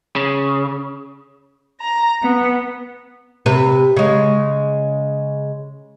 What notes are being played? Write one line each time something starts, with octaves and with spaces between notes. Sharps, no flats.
C#3
A#5
B3
C3 B4
C#3 G#3